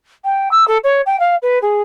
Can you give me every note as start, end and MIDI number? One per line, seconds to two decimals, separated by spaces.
0.25 0.49 79
0.51 0.67 88
0.68 0.78 69
0.84 1.01 73
1.06 1.19 79
1.20 1.36 77
1.42 1.59 71
1.62 1.82 68